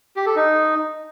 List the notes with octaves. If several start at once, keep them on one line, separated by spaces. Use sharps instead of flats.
G4
A4
D#4